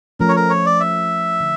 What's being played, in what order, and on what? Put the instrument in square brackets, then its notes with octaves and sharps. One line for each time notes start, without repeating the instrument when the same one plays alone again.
[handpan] F3 A3 C#4 [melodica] A#4
[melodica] C#5
A#4
C#5
D5
E5
[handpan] D3